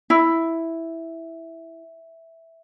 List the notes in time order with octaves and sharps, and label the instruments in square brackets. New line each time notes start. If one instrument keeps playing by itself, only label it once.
[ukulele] E4 [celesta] E5